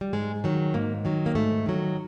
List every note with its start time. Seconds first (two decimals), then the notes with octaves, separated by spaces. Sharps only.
0.01 G3
0.13 G#2 G#3
0.44 D#3 F#3
0.74 G#2 A#3
1.05 D#3 F#3
1.26 A#3
1.35 G#2 A3
1.66 D#3 F#3